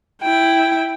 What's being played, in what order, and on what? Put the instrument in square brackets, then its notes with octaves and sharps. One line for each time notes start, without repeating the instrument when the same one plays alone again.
[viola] E4 G5